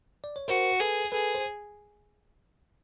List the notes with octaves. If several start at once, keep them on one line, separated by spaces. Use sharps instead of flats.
D5
C#5
F#4 A#4 C5
G#4 A4 B4
G#4 A4 B4
C5